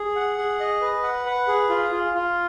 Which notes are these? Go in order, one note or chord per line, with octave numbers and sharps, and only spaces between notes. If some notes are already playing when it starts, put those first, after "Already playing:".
Already playing: G#4
F#5
G#4
D#5
B4
F#5
B4
G#4
F4
F4
F4